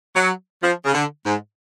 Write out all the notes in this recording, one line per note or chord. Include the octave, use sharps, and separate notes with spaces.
F#3
F3
C#3
D3
G#2